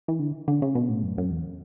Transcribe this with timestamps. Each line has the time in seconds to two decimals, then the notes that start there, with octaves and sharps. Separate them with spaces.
0.08 E3
0.19 D3
0.48 D3
0.62 C#3
0.75 B2
0.90 A2
1.03 F#2
1.18 F#2
1.31 E2